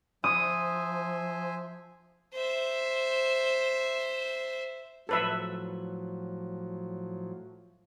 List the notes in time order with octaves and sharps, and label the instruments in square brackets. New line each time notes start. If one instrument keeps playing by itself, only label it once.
[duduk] F3 [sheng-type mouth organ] C5 E5 G#5 [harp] D#6
[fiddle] C5 E5
[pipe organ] A2 F3 F#3 [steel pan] A4 B4 E5